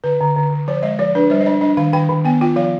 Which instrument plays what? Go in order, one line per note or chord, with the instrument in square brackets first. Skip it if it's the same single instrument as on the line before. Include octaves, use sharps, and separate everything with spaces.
[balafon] D3 B4
D3
D3
D3
F3 C5
G#3 D#5
F3 D5
D4 B4
G3 C5
D#5
D4 D5
D4 D#5
D#3 F5
D#3 G5
D#3
B3 G5
F4 G5
F3 F5